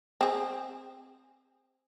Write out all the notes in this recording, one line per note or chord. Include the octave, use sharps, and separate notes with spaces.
C4 G#4